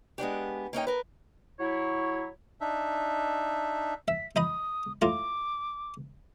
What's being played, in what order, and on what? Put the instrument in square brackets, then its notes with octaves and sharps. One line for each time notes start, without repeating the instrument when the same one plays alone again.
[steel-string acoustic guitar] G#3 B3 D4 G4
A#3 C#4 D#4 G5
A#4 B4
[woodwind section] F#3 E4 C#5
[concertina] D4 D#4 E5
[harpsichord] E5 [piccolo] B6
[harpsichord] D#4 D#5 B5 [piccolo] D#6
[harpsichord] A2 F4 A#5 [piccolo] D6